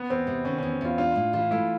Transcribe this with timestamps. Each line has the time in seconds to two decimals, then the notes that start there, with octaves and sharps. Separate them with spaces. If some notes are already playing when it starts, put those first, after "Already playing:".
Already playing: B3
0.10 E2 C4
0.27 C3
0.45 D#3 C#4
0.58 C#4
0.63 E2
0.81 E2 F4
0.98 D4 F4
1.16 A2
1.33 E3 F4
1.51 A3 E4